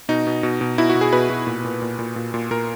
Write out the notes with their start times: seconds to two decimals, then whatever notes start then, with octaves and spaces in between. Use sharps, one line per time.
0.09 B2 D#4
0.27 B2
0.43 B2
0.61 B2
0.78 B2 E4
0.90 F#4
0.95 B2
1.01 G#4
1.13 B2 B4
1.30 B2
1.47 A#2
1.65 A#2
1.82 A#2
1.99 A#2
2.16 A#2
2.34 A#2
2.51 A#2 A#4